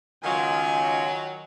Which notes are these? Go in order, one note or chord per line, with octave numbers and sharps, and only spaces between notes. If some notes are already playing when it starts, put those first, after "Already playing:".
C#2 D#3 F#3 F4 G#5